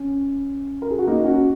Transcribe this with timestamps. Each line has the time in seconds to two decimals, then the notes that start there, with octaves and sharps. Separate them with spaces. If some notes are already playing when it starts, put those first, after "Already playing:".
Already playing: C#4
0.82 A#4
0.91 G#4
0.99 F#4
1.07 A#3 D#4
1.24 C#4 F#4